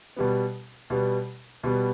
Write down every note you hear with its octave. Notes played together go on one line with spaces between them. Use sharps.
B2 G3 B3
B2 G3 B3
B2 G3 B3